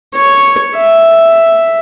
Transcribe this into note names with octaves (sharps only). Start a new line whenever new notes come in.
C#5
E5